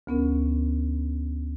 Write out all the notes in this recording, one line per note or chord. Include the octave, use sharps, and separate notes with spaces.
D2 B3 C#4 A#4